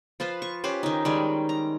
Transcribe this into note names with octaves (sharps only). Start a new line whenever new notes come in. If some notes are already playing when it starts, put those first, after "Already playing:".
F3 F4 B4 C5
C#6
C#4 G4 B4 C5
D#3 D#4
D#3 G3 G#3
A#5